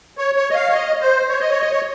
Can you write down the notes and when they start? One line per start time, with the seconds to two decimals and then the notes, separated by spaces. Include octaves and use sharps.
0.18 C#5
0.36 C#5
0.50 D#5
0.55 F5
0.69 C#5
0.73 D#5
1.01 C5
1.29 C#5
1.40 D#5
1.51 C#5
1.61 D#5
1.71 C#5